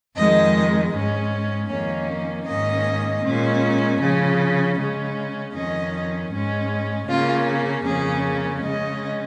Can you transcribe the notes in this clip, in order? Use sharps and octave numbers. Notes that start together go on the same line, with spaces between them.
F2 D#3 G#3 D#5
G#2 G#3 C#4
F2 D#3 A#3 C#4 C#5
G#2 D#3 A#3 C#4 D#5
A#2 G#3 C#4
C#3 F3 C#4
C#3 G#3 C#4
F2 D#3 C#4 D#5
G#2 G#3 C#4
C#3 A#3 C#4 F4
F2 C#3 A#3 C#4 G#4
C#3 G#3 C#4 D#5